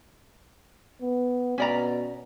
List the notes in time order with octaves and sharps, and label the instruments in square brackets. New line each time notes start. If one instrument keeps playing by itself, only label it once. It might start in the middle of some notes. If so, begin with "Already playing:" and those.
[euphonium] B3
[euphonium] B2 [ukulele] C#4 D5 A#5